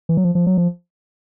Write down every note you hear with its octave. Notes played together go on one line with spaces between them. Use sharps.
E3
F#3
F3
F3
F#3
F3